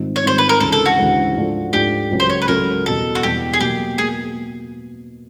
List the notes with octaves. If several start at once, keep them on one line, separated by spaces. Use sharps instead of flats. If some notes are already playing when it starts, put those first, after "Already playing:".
Already playing: G#2 D#3 G3 C4 F4
C#5
G#2 D#3 G3 C4 F4 C5
B4
A#4
D2 C#3 E3 G#3 C#4 A4
A4
F#4
D2 C#3 E3 G#3 C#4
G#2 F3 A3 D4 F4
G#2 F3 A3 D4 F4 G4
C#2 C#3 F#3 A3 C#4
C5
C#5
B4
C#2 C#3 F#3 A3 C#4 A#4
E2 B2 G3 A4
F#4
E2 B2 G3 G4
G#4
B2 F#3 A#3 G4
A#3 G#4